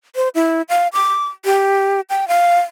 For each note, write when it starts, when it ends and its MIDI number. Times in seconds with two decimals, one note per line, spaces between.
0.16 0.29 72
0.35 0.62 64
0.69 0.88 77
0.93 1.26 86
1.45 2.01 67
2.10 2.28 79
2.28 2.60 77